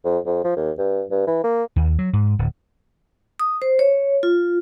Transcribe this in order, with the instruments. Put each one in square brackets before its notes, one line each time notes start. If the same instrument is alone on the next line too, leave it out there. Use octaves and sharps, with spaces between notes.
[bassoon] F2
F2
F3
D#2
G2
G2
E3
A#3
[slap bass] D#2
F#3
G#2
D1
[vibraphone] D#6
C5
C#5
F4